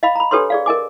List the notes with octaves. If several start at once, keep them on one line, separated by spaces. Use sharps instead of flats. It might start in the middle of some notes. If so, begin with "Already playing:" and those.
D#5 F5 B5
A#5 B5
D4 G4 A4 B4 C#5 C6
G#4 D5 F5
A#4 D#5 G#5 D6